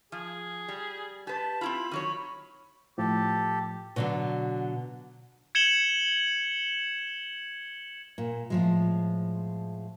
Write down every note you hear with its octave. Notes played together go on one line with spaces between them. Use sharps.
F3 G#4
G3
G4 B4 A5
C4 E4 F4 B5
D#3 F#3 C#5
A2 F3 G4 A4
B2 D3 F#3
G#6 C#7 E7 F#7 G7
A#2
A2 F3 G#3